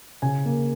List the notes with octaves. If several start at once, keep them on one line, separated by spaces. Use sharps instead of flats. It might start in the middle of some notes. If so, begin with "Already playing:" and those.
C#3 G#5
A#3